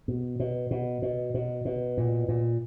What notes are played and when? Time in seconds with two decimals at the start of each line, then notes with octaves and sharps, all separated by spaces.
0.08 B2
0.40 B2
0.71 B2
1.02 B2
1.34 B2
1.65 B2
1.97 A#2
2.28 A#2